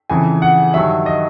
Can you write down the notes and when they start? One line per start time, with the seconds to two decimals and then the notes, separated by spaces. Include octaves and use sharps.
0.10 F2 C#3 E3 G#5
0.42 F#5
0.74 G2 D#3 F#3 E5
1.06 D#5